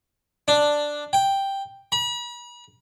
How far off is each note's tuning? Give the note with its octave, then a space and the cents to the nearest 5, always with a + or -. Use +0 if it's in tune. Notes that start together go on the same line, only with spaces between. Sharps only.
D4 +5
G5 +0
B5 -45